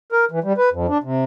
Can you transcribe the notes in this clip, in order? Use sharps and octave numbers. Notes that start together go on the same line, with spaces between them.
A#4
E3
G3
B4
F2
D4
C3